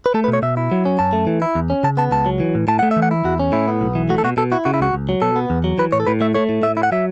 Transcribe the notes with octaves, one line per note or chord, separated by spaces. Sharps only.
B4
A3 A4
B4
B2
C#5
B2 E5
E4
F#3
C#4
F#2 A5
A3
E3
E4
E2
C#4
C#3 A5
B3 A5
C#2 A5
F#3
E3
A2
A2 A5
A3 F#5
E5
E3
F#5
E4
E2 F#4
C#4
A2 E4
B3
B1
E3
A3 F#4
A4
B2 F#4
B2 A4
E4 F#4
C#3 F#4
E4
C#2 F#4
C#2
F#3
B2 A4
B3
E2
F#3
E3 B4
A2 C#5
A4
A2 B4
A3 E5
A3 C#5
A2
A2 E5
E4
F#5
F#3 E5